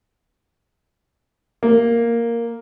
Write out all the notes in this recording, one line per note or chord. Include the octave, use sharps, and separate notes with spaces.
A#3